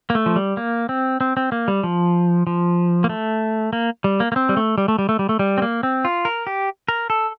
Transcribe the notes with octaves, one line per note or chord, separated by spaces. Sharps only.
A#3
A3
F3
G3
A#3
C4
C4
C4
A#3
G3
F3
F3
A#3
A3
A#3
G3
A#3
A#3
C4
G3
A3
G3
A3
G3
A3
G3
A3
G3
C4
A#3
C4
F4
A#4
G4
A#4
A4